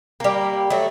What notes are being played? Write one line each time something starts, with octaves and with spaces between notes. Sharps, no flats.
G3 A#3
F#3 A3